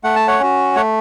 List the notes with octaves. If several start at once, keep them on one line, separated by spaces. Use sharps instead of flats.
A3 F#5
A5
C#5 F#5
C#4 F#4
A3 C#5 F#5